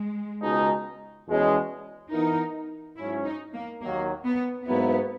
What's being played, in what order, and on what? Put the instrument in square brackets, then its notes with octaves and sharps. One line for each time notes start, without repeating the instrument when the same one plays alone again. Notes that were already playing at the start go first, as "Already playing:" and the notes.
Already playing: [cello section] G#3
[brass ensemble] C#2 B2 G#3 D#4
E2 B2 G#3 C#4
[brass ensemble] E3 B3 E4 A#4 [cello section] D#4
[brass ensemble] G#2 F#3 C#4 [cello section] E4
[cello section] D#4
A#3
[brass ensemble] D#2 D#3 F#3 [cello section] A#3
[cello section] B3
[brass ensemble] G#2 F#3 A#3 E4 B4 [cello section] B3